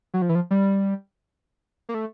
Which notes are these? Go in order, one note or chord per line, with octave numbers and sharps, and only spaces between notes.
F#3
F3
E3
F3
G3
A#3
A3